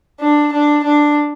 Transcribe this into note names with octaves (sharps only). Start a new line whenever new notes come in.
D4
D4
D4